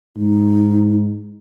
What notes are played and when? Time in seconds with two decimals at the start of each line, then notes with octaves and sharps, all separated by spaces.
0.17 G#2 D#4